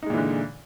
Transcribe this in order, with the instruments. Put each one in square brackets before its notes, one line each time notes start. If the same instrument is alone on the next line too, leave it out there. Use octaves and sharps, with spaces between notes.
[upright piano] D#4
G#3
A#2
E3
D3